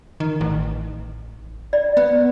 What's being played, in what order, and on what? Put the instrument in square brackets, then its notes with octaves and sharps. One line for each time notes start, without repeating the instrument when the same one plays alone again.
[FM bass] D#3
A1
[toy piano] D5
[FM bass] B3